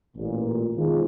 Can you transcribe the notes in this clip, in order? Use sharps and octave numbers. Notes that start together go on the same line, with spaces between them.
A1 A#2
B2 D#3 F3 G#3